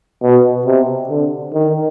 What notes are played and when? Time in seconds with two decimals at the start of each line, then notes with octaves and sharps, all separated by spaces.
0.22 B2
0.66 C3
1.09 D3
1.54 D#3